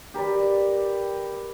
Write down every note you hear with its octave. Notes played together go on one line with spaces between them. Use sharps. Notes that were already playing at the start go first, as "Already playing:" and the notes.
G4 A#4 B4 D5